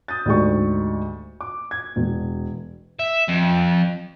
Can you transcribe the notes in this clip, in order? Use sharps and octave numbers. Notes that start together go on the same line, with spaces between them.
D#6 G6 A6
D2 G#2 A3 G4 D5 C#6
D6
G#6
E1
E5
F2